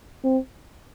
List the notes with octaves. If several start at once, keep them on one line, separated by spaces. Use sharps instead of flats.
C4